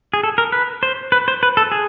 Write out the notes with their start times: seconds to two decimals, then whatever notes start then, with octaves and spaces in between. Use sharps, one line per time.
0.14 G#4
0.23 A4
0.38 A#4
0.52 B4
0.83 C5
1.12 B4
1.28 C5
1.43 B4
1.57 A4
1.72 G#4